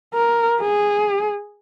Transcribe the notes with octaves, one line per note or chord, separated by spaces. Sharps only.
A#4
G#4